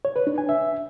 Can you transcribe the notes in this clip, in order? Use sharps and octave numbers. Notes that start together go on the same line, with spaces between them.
C#5
B4
D4
G#5
E5